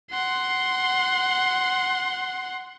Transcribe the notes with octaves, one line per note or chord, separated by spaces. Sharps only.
F#5 C6